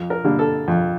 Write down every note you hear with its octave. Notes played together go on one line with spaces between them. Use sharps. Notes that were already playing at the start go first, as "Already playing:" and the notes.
Already playing: F2
A#4
D3 G3 A#3
A4
F2